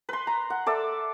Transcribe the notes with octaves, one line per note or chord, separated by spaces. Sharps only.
B4 C6
A#5
F#5
A4 D5 E5